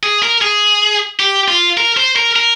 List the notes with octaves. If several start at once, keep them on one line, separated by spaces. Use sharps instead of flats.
G#4
A#4
G#4
G4
F4
A#4
C5
A#4
A#4